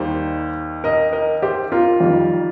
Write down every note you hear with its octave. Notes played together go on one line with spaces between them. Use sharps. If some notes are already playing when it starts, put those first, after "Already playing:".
Already playing: D#2 D#3 G3 C5
A#4 D#5
A#4 D#5
G4 C5
F4 A#4
F2 D#3 G3